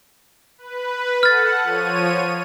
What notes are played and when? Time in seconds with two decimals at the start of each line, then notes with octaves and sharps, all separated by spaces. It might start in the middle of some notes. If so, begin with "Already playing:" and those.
0.58 B4
1.23 A4 F#5 F6 A6
1.63 F3 C#5 D#7